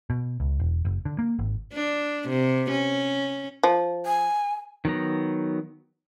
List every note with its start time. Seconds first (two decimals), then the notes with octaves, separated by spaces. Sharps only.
0.10 B2
0.40 C#2
0.60 E1
0.85 F#1
1.05 D3
1.19 A#3
1.39 G#1
1.73 D4
2.29 C3
2.71 C#4
3.63 F3
4.06 G#5
4.85 D#3 F#3 B3 A#5